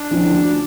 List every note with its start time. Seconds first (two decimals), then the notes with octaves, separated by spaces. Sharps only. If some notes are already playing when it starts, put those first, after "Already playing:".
Already playing: D4
0.11 D3 F3 C#4 E4
0.34 D2